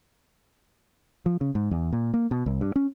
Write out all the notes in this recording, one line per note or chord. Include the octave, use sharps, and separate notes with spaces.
F3
C#3
G#2
E2
A#2
A#3
B2
C2
G2
C#4